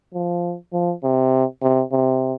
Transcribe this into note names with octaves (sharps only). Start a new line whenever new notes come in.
F3
F3
C3
C3
C3